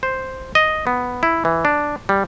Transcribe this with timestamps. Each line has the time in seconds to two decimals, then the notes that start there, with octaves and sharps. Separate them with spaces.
0.03 C5
0.55 D#5
0.87 B3
1.23 E4
1.45 E3
1.65 D4
2.09 G3